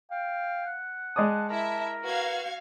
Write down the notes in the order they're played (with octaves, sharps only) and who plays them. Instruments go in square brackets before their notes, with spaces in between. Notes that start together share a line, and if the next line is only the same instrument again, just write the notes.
[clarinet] F5 [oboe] G5
[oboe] F#5
[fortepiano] G#3 D5 D#6 [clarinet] A5
[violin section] E4 E5 [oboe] A#4 [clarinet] A5
[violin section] F#4 F5 G#6 [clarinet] B4